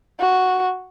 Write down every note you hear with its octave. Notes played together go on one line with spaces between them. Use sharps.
F#4